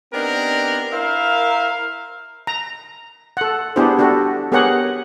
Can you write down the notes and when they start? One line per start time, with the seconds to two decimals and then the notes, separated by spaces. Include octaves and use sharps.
0.13 B3 C4 D4 D#4 G4 A#4
0.92 E4 A#4 C5 E5 F5
2.47 A#5
3.37 A4 F#5
3.76 B3 D4 E4 G4 G#4 C5
3.99 D4 F#4 G4 A4
4.52 B3 G4 G#4 A#4 C#5 F#5